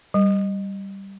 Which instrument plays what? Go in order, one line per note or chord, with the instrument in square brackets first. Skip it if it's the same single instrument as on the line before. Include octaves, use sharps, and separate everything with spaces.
[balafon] G3